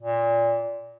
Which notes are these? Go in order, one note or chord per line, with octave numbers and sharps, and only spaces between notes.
A#2